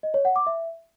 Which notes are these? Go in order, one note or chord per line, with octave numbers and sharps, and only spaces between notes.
D#5
C#5
F#5
D6
E5